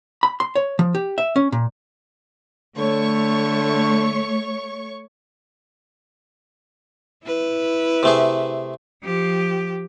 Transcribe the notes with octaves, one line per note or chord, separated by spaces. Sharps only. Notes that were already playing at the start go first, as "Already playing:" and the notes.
B5
C6
C#5
F3
G4
E5
C#4
A#2
D3 A3 C#5 C#6
E4 B4
C3 A3 G#4
F3 G4